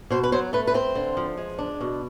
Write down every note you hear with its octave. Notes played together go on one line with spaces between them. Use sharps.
B2 C5
B4
F#3 C5
A3 B4
B4
C4 C5
D3
F3
G#3
D4
B2